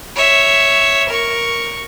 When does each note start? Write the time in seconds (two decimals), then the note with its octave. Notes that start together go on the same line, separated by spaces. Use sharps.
0.15 C#5 E5
1.08 A#4 C#6